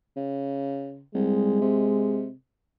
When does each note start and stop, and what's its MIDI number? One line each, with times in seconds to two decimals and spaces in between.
0.17 1.03 49
1.15 1.61 36
1.15 2.28 56
1.61 2.32 48